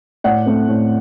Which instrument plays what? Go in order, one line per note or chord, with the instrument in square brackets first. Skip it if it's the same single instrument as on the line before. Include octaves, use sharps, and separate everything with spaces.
[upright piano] A2 D5 F#5
A3 C4
A2